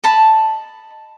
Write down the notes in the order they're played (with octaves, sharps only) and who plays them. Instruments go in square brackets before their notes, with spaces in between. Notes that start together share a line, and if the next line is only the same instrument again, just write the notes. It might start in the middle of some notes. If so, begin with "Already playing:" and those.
[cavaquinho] D#5 A5 B5